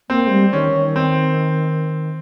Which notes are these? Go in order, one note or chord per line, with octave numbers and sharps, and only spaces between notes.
A#3 C4
G#3
G3
D#3 C#4
D#3
C4